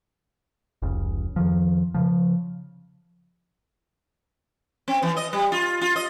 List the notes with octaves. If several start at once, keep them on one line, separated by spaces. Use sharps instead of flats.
F1 C#2 C#3
F2 D#3 F3
C#3 F3
C4
E3
D#5
G3
F4
F4
D#5